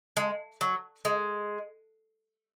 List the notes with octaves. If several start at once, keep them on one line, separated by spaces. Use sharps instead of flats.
G#3
F#3
G#3